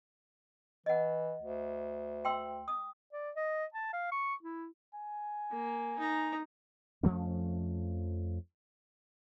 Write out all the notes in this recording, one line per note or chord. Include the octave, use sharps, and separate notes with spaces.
E3 D#5 F#5
D2
G5 C6 E6
D#6
D5
D#5
A5
F5
C#6
E4
G#5
A#3
D#4 A#5
F2 F3 A3 C#4